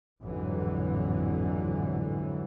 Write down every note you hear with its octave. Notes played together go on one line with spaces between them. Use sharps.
A1 F2 G#2 D3 E3 F#3